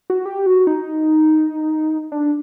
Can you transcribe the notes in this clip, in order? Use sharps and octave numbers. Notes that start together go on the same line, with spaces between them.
F#4
G4
F#4
D#4
D4